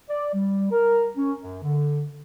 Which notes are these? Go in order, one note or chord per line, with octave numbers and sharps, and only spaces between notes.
D5
G3
A#4
C#4
F#2
D3